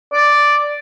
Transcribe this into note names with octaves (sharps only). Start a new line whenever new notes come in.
D5